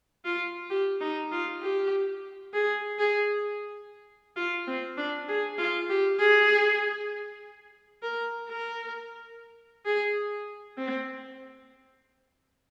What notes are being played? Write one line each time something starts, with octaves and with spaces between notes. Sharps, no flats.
F4
G4
D#4
F4
G4
G#4
G#4
F4
C4
D4
G#4
F4
G4
G#4
A#4
A#4
G#4
C4